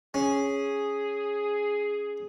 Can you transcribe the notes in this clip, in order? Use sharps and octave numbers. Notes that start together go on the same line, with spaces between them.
C#4 G#4